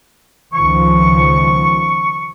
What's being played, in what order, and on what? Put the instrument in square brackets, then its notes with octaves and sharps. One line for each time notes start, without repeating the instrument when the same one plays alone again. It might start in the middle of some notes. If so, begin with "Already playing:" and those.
[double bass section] C#2 D#3 F3 [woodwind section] C#6